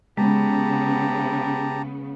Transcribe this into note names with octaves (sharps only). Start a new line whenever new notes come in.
C#3 G#3 B3 G4 A5 A#5